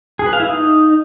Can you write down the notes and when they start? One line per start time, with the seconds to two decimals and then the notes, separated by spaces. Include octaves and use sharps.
0.19 G#4
0.26 B4
0.33 F5
0.40 E4
0.46 D#4